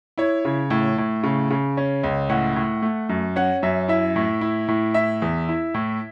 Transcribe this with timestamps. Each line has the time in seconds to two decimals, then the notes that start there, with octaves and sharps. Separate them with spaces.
0.18 E4 C#5
0.45 C#3
0.70 A2
0.98 A2
1.23 C#3
1.50 C#3
1.77 C#4
2.03 C#2
2.29 A2 F#5
2.56 A2
2.82 A3
3.09 F#2
3.36 C#4 F#5
3.63 F#2 E5
3.88 E4 E5
4.16 A2
4.41 E4
4.68 A2
4.94 E4 E5
5.22 E2
5.49 E4
5.74 A2